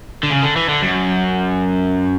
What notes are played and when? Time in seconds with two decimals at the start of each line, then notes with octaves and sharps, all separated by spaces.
0.23 D3
0.31 C#3
0.43 D3
0.56 E3
0.69 D3
0.83 F#2